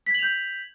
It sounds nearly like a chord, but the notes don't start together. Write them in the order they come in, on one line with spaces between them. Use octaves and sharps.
B6 G#6 F#7 F7 G6